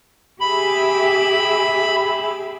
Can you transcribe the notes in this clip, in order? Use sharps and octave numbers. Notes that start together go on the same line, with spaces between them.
G4 G#4 E5 B5